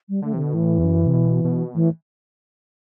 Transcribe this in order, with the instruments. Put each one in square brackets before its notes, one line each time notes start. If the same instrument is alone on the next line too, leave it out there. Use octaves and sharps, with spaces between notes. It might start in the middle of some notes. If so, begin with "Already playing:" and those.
[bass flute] G3
[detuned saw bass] D3 [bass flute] A3
[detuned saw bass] C3 [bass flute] E3
[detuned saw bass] B2 [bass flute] D3
[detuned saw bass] A2 [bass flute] E3
[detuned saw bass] E2
F#2
C3
B2
B2
[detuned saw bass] A2 [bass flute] E3